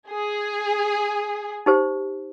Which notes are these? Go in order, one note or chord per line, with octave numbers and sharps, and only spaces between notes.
G#4
D#4 G4 C5